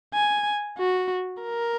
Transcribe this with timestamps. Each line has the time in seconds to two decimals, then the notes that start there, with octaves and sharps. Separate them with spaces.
0.14 G#5
0.78 F#4
1.43 A#4